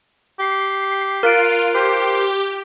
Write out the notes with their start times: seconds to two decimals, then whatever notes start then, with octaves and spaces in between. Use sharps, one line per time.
0.39 G4 C7
1.23 F4 A#4 F#6 D7
1.74 G4 C5